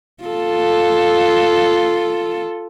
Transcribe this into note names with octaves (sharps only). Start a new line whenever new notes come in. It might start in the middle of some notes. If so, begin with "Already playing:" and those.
F4 A4